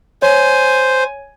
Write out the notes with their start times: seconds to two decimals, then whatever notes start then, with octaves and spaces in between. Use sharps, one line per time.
0.22 C5 C#5 G#5